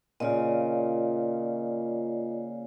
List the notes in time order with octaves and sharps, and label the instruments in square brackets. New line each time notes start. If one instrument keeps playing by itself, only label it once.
[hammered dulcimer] A#2 C#3 [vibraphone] F4 D5 D#5